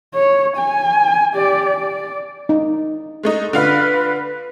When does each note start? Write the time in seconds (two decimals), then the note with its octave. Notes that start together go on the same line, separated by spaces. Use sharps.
0.14 C#5
0.57 G#5
1.33 G4 D5
1.66 D5
2.49 D#4
3.23 G#3 A3 D#4
3.53 D3 F4 B4 F5